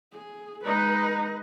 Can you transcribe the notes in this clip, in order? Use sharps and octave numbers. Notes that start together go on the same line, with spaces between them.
G#4
G#3 D#4 B4 D#5